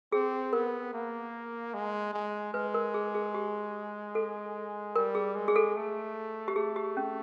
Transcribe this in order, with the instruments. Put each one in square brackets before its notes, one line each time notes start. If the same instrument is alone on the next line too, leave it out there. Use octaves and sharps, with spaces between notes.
[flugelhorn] C4 [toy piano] G#4
[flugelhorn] B3 [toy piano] A#4
[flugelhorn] A#3
G#3
G#3
[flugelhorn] G#3 [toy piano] B4
[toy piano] A#4
G#4
G#4
G4
A4
[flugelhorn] G3 [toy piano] A#4
[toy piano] G#4
[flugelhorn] G#3
[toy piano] G#4
A4
[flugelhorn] A3
[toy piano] G4
[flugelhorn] A3 [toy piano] G#4
[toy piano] G4
C#4